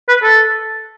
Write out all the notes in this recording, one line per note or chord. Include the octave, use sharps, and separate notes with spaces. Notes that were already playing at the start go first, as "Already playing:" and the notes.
B4
A4